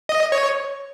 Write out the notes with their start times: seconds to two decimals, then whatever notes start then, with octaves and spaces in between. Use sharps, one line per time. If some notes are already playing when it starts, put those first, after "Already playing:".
0.09 D#5
0.32 C#5